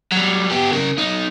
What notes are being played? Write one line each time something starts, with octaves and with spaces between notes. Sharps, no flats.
F#3 G3
B3 G4
C#3 A#4
B1 D#4